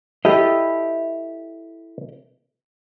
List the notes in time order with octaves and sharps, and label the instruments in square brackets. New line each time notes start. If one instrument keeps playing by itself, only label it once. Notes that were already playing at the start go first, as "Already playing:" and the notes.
[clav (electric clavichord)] E4 A4 [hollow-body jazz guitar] G4 D#5